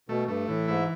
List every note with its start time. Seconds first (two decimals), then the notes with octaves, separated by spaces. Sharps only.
0.08 B2 A3
0.28 G2 A3
0.48 A2 E3
0.68 G#2 E4